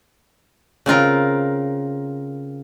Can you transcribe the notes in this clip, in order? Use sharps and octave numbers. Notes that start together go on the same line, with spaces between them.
C#3 C4 F4 A#4